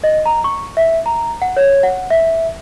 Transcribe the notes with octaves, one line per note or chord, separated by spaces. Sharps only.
D#5
A#5
C#6
E5
A#5
F#5
C#5
F#5
E5